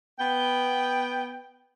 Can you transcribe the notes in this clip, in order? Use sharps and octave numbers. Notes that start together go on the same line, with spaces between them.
B3 G5